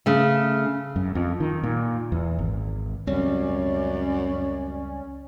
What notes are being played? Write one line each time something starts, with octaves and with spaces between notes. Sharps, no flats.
C#3 A3
F#2
F2
D#3
A#2
E2
G#1
C#2 F#2 G3 C4 C#4 D5